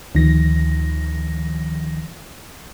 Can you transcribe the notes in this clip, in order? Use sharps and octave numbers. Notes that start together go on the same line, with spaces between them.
D2 D#3 F3 A#6